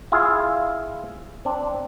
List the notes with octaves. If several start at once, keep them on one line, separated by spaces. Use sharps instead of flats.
E4 F4 G#4 F5
C4 D4